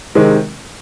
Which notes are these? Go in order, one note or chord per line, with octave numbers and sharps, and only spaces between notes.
C3 D#3 G#3 C4